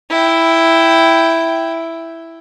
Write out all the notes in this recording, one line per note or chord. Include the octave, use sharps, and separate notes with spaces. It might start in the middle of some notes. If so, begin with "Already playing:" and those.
E4 G5